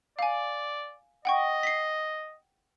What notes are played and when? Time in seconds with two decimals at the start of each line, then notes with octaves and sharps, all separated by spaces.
0.19 D5 F5 G#5
1.25 D#5 F#5 G5 C#6
1.63 B6 C7